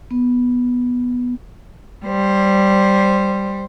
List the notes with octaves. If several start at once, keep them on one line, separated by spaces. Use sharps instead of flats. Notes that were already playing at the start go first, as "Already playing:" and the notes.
B3
G3 C5